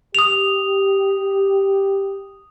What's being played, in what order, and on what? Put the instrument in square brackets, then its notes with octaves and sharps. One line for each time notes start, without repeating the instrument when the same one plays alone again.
[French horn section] G4 [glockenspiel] D#6 F7